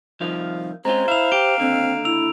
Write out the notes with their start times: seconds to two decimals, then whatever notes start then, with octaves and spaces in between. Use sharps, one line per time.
0.21 C2 D#3 F3 F5
0.85 G#3 C4 C#4 F4 C5 A#5
1.08 E4 F5 E7 F7
1.32 G4 D7
1.60 D#2 D3 C4
2.05 E4 E6 F7